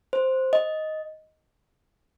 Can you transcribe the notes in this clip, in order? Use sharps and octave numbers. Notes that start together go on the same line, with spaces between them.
C5
D#5